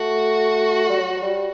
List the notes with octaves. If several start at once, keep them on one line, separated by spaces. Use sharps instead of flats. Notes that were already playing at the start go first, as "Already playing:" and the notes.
Already playing: A3 F#4
G3
F#3
F#3
G3